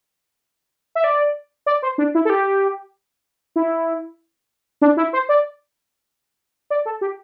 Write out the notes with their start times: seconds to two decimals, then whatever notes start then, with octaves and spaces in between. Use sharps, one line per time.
0.95 E5
1.04 D5
1.66 D5
1.82 C5
1.98 D4
2.15 E4
2.25 A4
2.30 G4
3.56 E4
4.82 D4
4.97 E4
5.13 C5
5.29 D5
6.70 D5
6.86 A4
7.01 G4